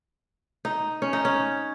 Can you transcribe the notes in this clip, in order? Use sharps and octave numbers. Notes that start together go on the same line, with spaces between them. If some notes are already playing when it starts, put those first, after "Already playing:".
D#4
C#4
D#4
C#4